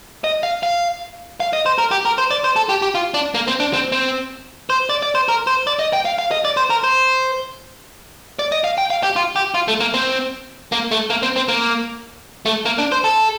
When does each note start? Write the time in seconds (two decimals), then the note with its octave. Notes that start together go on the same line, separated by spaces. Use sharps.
0.24 D#5
0.43 F5
0.63 F5
1.40 F5
1.53 D#5
1.66 C5
1.78 A#4
1.91 G4
2.05 A#4
2.18 C5
2.31 D5
2.44 C5
2.56 A4
2.69 G4
2.82 G4
2.95 F4
3.14 D4
3.34 A#3
3.48 C4
3.60 D4
3.73 C4
3.92 C4
4.70 C5
4.89 D5
5.03 D5
5.15 C5
5.29 A#4
5.47 C5
5.67 D5
5.79 D#5
5.93 G5
6.05 F5
6.19 F5
6.31 D#5
6.45 D5
6.57 C5
6.70 A#4
6.84 C5
8.39 D5
8.52 D#5
8.64 F5
8.78 G5
8.90 F5
9.03 G4
9.16 F4
9.36 G4
9.54 F4
9.68 A3
9.80 A#3
9.94 C4
10.72 A#3
10.91 A3
11.10 A#3
11.23 C4
11.36 C4
11.48 A#3
12.46 A3
12.65 A#3
12.78 D4
12.92 C5
13.04 A4